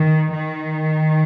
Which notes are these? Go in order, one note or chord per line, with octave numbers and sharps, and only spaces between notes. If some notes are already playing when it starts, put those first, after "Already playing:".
Already playing: D#3
D#3